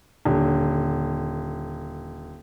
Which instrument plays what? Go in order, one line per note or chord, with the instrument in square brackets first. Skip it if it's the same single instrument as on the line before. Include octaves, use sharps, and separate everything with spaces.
[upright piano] D#1 D3